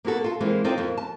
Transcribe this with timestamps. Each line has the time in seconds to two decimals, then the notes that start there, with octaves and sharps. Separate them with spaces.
0.05 A#3 B3 F#4 A4
0.24 F4 A4
0.40 E3 G#3 A#3 C4
0.64 C4 D#4 F4 A4 D5
0.78 F2 A#3
0.97 A5